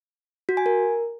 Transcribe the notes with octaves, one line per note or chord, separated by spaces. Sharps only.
F#4
G#5
A#4